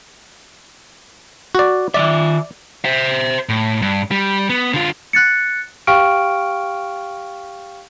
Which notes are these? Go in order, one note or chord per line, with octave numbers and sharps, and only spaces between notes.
F#4 D5
D#3 F3 D5 E5
C5 E5
A2
G2
G3
B3
D3 F4
F#6 A6 C#7
G4 F5 G5 C#6 F6 D7